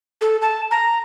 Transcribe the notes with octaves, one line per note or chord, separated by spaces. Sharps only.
A4
A5
A#5